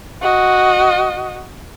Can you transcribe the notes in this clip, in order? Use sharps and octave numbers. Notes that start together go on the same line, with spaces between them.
F#4 D#5